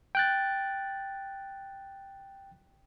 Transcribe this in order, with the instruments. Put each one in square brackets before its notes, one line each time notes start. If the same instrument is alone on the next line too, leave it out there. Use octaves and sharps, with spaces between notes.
[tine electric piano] G5 F#6 A6